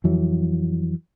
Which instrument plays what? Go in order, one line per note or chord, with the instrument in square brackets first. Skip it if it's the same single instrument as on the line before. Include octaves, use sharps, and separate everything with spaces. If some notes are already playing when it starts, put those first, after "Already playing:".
[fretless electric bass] F2 E3 F#3